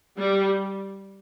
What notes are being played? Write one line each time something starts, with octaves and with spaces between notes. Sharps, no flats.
G3